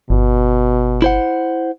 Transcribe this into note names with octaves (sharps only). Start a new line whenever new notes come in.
G1 B2
E4 C5 F#5